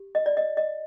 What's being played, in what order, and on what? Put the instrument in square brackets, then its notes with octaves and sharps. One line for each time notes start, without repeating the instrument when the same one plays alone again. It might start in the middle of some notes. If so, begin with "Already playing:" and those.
Already playing: [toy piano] G4
D#5
D5
D#5
D#5